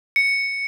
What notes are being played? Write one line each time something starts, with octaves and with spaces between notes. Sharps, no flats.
C#7